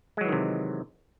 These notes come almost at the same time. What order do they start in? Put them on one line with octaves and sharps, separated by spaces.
G#3 F#3 E3 D#3 C3